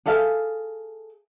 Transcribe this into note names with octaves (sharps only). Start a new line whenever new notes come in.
G#4 A4 E5 F5